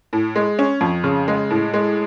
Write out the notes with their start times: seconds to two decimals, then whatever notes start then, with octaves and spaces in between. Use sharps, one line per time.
0.13 A2
0.36 G#3
0.59 C#4
0.81 F2
1.04 C#3
1.28 G#3
1.50 A2
1.74 G#3